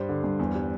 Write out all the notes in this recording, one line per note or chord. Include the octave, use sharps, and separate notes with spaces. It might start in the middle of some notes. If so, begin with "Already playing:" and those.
Already playing: G2 G3 C5
D3
G2
E2
G3